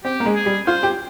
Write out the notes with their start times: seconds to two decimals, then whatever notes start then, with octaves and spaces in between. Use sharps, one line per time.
0.04 C4 G4
0.20 A#3
0.26 G#3
0.36 G#4
0.46 G3
0.67 F4 C5
0.83 G4